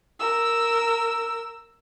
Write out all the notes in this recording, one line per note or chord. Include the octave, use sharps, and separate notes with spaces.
A#4 E6